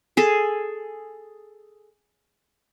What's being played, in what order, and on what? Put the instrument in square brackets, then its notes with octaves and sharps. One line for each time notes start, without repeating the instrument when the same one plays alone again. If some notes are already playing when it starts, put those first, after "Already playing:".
[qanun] G#4 A4